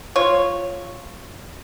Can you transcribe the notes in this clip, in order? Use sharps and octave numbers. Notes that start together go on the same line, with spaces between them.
F4 C#5